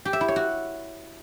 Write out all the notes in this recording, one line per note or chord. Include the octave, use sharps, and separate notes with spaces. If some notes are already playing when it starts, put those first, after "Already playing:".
G4
E5
E4
C#5
F#4